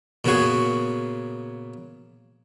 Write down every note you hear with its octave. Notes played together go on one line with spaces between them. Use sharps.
A#2 C#3 B3 F#4 G#4